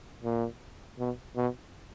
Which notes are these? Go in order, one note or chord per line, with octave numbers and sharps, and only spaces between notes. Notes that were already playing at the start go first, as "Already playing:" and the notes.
A#2
B2
B2